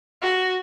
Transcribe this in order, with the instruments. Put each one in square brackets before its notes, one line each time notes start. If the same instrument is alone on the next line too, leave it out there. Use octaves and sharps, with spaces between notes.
[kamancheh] F#4